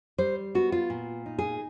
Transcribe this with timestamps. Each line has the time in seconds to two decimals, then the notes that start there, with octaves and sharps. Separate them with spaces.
0.18 G3 C5
0.55 B3 F#4
0.72 F4
0.90 A#2
1.26 D#4
1.39 G#4